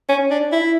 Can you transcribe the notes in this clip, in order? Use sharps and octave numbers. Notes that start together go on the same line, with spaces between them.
C#4
D4
E4